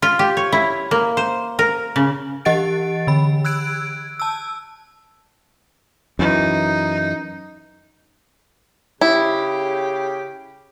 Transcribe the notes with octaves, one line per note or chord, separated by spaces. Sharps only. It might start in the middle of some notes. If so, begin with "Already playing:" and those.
F4
G4
C#5
E4
A#3
C5
A#4
C#3
E3 G4 D#5 F#5 A6 D7
D3 B5
E6 F#6 G#6 D7
A5 E6
F#2 E3 D#4
C#3 E4 G4